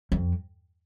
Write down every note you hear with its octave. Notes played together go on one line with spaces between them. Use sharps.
F2